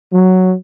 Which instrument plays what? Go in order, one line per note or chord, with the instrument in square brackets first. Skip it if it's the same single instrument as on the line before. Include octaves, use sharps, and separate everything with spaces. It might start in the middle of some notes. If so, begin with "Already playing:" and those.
[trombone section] F#3